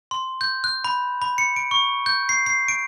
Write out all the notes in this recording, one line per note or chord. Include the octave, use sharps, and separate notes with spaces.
C6
G6
F#6
B5
B5
C#7
D7
C#6
G6
C7
C7
D7